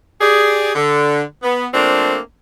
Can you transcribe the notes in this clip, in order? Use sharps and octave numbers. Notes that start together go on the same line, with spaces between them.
G4 G#4 D5
D3
B3
F3 A3 A#3 C4 D4